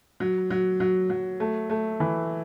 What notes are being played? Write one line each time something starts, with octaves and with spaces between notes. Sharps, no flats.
F#3
F#3
F#3
F#3
A3
A3
E3